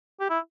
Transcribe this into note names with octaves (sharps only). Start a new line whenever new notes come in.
G4
E4